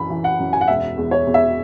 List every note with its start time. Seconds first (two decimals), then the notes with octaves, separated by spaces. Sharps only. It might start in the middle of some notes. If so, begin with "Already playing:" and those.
Already playing: F#2 E3 B5
0.10 E3
0.24 F#5
0.39 F#2
0.53 G#5
0.61 F#5
0.68 E1 E5
0.97 E2
1.11 C#5
1.27 E2
1.34 E5